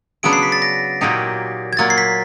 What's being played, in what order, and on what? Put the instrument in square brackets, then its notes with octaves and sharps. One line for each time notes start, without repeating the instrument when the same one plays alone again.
[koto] C#3 F#3 B3 D4 [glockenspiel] D7
[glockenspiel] C7
B6
A6
A#6
[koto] A#2 F#3 A#3 D#4 G4
[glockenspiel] G#6
[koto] A#2 F#3 A#3 [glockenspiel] A6
[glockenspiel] C7
B6